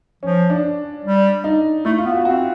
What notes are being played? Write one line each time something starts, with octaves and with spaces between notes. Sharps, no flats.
F3 C#4
D4
G3
D#4
A3 E4
F4
B3
F#4
C4 F#4